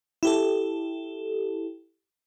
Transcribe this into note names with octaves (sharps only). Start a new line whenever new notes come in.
E4 G4 A4